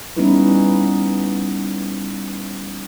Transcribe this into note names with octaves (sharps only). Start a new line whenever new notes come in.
G3 B3 C#4 D#4 E4 B4